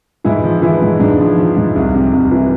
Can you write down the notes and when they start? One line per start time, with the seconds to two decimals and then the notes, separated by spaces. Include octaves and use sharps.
0.24 G#2 E3 E4
0.44 F3
0.62 E3 F3 E4
0.82 G#2
1.00 G#2 D4
1.19 F3
1.37 F3
1.57 G#2
1.75 C2
1.94 C3
2.13 C2
2.31 E3